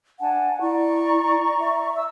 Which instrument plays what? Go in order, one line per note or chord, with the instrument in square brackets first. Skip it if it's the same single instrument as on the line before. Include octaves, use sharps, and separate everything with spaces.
[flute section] D4 G#5 A5 [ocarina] F#5
[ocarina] E4 [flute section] D5 A#5 C#6
[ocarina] E5
[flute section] E6